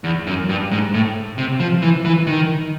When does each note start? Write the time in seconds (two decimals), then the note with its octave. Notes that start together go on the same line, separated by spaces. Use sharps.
0.04 E2
0.27 F#2
0.49 G2
0.71 G#2
0.94 A2
1.38 C3
1.60 F3
1.82 E3
2.05 E3
2.27 D#3